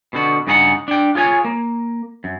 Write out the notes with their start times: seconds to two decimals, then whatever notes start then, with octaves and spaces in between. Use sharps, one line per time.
0.13 B2 D3 F#4
0.47 G2 C#3 D#4 G#4 B4 F#5
0.88 D4 G5
1.15 F4 G#4 C#5 G#5
1.45 A#3
2.24 F#2